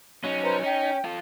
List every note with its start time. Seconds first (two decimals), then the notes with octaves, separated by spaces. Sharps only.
0.24 F#3 C#4 D#4
0.43 B4 C5 A#5
0.64 D#4 G5
1.05 F4 A4